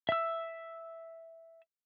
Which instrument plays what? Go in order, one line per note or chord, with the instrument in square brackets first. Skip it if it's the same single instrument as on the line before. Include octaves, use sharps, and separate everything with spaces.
[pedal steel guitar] E5 E6